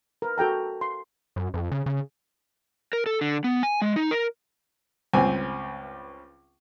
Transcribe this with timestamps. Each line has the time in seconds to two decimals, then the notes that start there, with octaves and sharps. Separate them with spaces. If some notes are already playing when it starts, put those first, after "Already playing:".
0.22 A#4 B4
0.38 F#4 A4 G5 A#5
0.81 C6
1.36 F#2
1.54 F2
1.72 C#3
1.86 C#3
2.93 A#4
3.06 A4
3.21 D3
3.44 B3
3.63 G#5
3.82 G#3
3.96 D#4
4.11 A#4
5.13 C#2 G2 C4 G#5